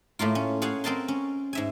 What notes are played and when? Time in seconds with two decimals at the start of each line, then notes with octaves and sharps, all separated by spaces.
0.19 A2 A3 A#3 F4
0.35 C#4
0.62 G#4 C#5 F5 F#5 G#5
0.84 C4 A#4 D#5 A5 C6
1.08 C#4
1.53 G#2 E5 G#5